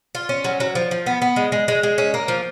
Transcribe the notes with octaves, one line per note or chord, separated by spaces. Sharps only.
F4
C#4
F#3
F#3
F3
F3
B3
B3
G#3
G#3
G#3
G#3
C#4
A#3
F3